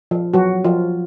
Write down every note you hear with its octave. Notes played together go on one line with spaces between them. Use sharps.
F3 F4
F#3 F#4
F3 F4